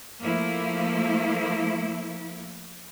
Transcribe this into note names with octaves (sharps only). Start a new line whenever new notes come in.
F3 A3 A#3 E4